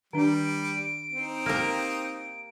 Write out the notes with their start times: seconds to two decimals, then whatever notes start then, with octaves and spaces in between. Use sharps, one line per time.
0.13 D#3 G3 D4 D7
1.12 C4 D#4
1.46 A#3 G4 A#4